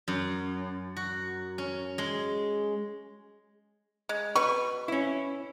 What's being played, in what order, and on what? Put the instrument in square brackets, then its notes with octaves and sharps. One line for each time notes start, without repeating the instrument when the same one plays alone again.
[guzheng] F#2
F#4
C#4
G#3
[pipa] G#3
[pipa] B2 C#6 [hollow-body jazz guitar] B4
[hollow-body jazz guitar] C#4 E4